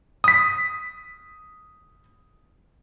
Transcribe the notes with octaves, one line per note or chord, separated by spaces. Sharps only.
D#6 B6